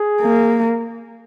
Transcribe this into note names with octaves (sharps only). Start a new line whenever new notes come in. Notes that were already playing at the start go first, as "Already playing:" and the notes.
Already playing: G#4
A#3